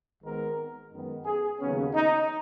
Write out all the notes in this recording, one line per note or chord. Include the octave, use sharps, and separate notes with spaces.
G#1 G#2 D#3 G#3 B3 A#4
F#2 D#3 G#3 B3
G#4
D#2 C#3 F#3 B3 C#4
D#4